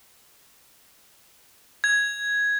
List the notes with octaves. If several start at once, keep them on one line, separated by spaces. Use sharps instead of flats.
G#6